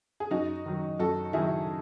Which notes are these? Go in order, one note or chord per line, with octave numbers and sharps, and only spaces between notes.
G#4
F#2 D#4 F#4
D#3 F#3
F#2 F#4 A4
D#3 F#3 E4 G#4